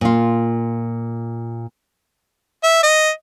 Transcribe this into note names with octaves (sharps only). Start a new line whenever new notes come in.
A#2 F4
E5
D#5